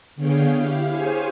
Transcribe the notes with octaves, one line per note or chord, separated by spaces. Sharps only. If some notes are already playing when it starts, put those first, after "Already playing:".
D3 B3 G#4 C#5 F5 G5
E4 G4 F5
G4 G#4 C5 C#5 F5 G#5